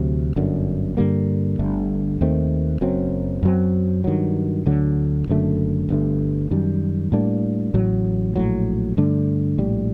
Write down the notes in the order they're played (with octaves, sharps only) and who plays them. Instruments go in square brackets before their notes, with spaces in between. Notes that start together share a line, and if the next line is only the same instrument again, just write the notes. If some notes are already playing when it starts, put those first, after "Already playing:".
Already playing: [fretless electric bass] D2 C3 F#3
G1 F#2 D3
G2 D3 G3 A#3
G1 G2 D3 A3
D#2 D#3 A3 C4
F#1 F#2 F#3 C4
F#2 F#3 C4
G2 D#3 F#3
D2 D3 F#3
F#1 F#2 D3 A3
G1 G2 D3 A3
F#2 D#3 G3
A2 G3 A#3 D4
A1 A2 F#3
A#1 A2 F#3
G2 D3 A3 D4
A#1 A2 G3